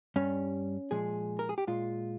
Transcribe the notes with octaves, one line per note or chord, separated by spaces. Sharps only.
G2 G3 C#4
A#2 F3 G#3 G#4
A#4
G#4
G4
A#2 G#3 F4